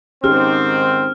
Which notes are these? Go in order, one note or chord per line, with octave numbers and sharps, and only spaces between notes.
G#2 D#3 C4 C#4 G4 G#4 F6